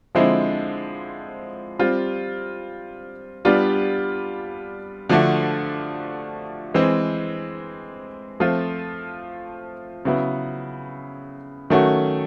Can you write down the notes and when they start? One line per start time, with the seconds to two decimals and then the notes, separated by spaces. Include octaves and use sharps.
0.15 D3 F3 G#3 C4 E4
1.79 G3 C4 F4
3.45 G3 B3 D4 F4
5.09 D3 F3 A3 D4 F#4
6.74 E3 G#3 C4
8.40 F3 A3 C4 F4
10.05 C#3 F#3 B3 E4
11.70 D#3 F#3 A3 C#4 F#4